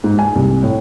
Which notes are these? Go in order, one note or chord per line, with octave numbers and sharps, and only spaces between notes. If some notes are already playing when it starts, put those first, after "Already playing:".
G#2
G#5
C2
A2